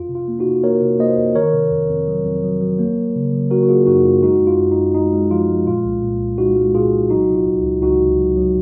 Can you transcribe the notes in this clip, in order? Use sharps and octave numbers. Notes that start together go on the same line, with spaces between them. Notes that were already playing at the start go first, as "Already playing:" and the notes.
Already playing: F2 F4
C3
F4
A#3
D#4 F#4
C3
A#3 A#4 C#5
C3
A#3 C5 D#5
F2
D#3 A#4 C#5
C3
F2
F2
F#3
F2
F#3
F#3
A#3
F#3
C#3
F#3
A#3 F#4 A#4
F#4
A#3 F4 G#4
F#2 D#4 F#4
F#2 F4
G#3 D#4 F#4
F#2
F4
F#2
D#4
F#2
G#3 D#4
G#3
F3 F4
G#3
A#2 F4
C2
A#2
C2
G#3 D#4 F#4
G#3
A#2 F4 G#4
C2
F#3 D#4 F#4
C3
F4
C#2
C#2
C#2 D#4 F#4
C3
F#3
F#3